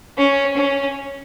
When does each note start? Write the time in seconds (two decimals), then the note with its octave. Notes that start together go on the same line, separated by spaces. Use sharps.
0.17 C#4
0.57 C#4